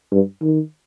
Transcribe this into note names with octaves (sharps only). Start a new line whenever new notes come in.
G2
D#3